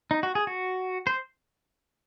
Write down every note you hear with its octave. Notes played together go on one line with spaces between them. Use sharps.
D#4
F#4
G#4
F#4
C5